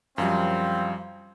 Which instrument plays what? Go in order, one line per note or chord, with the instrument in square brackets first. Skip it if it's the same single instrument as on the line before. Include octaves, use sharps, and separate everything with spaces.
[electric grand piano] F#2 F3 G3 [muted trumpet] C4 [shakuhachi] F5